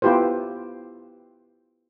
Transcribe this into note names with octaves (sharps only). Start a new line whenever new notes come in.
B3 E4 F4 G4 B4 C5